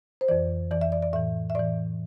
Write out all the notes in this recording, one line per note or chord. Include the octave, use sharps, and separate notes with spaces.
C5
F2 E3 D5
F2 E3 D5
E5
D5
D5
A2 E3 E5
E5
A2 E3 D5